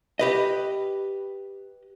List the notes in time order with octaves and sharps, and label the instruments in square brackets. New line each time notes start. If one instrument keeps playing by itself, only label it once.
[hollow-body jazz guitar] G4 B4 D#5